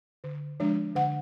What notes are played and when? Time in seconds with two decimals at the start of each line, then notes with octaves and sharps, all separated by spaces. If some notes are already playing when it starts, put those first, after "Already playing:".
0.24 D3
0.60 F3 G#3 D4
0.96 D3 F#5